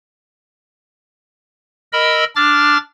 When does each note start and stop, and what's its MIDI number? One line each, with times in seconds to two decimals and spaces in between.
1.93 2.24 70
1.93 2.24 75
1.93 2.24 83
1.93 2.24 88
2.36 2.78 62
2.36 2.78 86
2.36 2.78 89
2.36 2.78 93